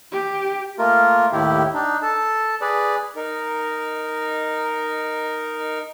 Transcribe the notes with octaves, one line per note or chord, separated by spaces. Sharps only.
G4
A3 A#3 F4 A#4
D#2 A2 D#3 E4 G4
D4 D#4
A4 A5
G#4 B4 D5
D#4 A#4